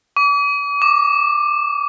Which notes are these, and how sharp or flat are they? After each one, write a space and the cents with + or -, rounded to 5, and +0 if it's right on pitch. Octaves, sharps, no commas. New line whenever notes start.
D6 -40
D6 +15